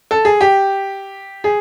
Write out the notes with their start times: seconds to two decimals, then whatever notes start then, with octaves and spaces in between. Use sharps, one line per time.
0.11 A4
0.25 G#4
0.41 G4
1.44 G#4